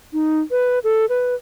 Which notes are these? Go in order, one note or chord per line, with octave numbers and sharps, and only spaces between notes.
D#4
B4
A4
B4